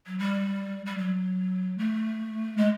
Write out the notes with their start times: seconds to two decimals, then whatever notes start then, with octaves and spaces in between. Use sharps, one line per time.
0.07 F#3
0.19 G3
0.86 G3
0.98 F#3
1.78 A3
2.57 G#3